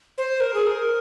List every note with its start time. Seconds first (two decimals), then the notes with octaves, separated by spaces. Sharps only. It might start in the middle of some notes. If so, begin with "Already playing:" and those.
0.18 C5
0.40 A#4
0.54 G#4
0.67 A#4